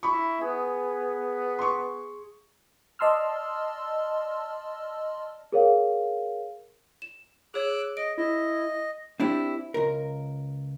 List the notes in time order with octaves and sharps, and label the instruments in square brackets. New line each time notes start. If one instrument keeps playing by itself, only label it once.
[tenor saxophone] E4 [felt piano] B5 C#6
[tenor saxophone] B3 [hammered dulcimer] G#4
[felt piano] C6 C#6
[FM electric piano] D5 D#5 A5 C6 E6 F6
[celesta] G#4 A#4 C#5 F5
[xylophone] E7
[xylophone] G#4 C#5 [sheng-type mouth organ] D6 E6 F#6
[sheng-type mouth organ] D#5 [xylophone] D7
[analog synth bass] E4 [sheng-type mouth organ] D#5
[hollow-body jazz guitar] C4 D4 E4 G4
C#2 A#4